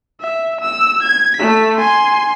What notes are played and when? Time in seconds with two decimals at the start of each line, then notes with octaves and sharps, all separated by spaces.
0.21 E5
0.61 E6
1.03 G#6
1.37 A3 B6
1.78 G#5 C6